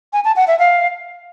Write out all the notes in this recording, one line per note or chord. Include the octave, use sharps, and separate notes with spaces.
G#5
A5
F#5
E5
F5